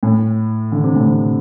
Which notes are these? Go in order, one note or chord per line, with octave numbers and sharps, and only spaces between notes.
A2
D3
C3
A2
C3